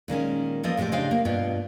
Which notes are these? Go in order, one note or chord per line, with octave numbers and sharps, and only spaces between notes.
A#2 D#3 G#3 C#4
E3 F3 A#3 D5 D#5
A2 C3 G#3 G4 D5
C#3 D4 C5 D#5 F5 G5
A#3
G2 B2 B3 F4 G5